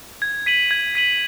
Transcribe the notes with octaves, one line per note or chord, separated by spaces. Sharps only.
G#6
B6 D#7 F#7
G#6
B6 D#7 F#7